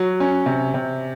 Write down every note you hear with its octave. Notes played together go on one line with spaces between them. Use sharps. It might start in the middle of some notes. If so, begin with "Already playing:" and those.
Already playing: F#3
C#4
C3
C3